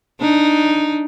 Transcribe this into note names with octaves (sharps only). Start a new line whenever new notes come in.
D4 D#4